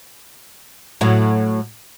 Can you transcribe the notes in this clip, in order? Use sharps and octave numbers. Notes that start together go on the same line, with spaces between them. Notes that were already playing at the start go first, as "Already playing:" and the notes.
A2 F#3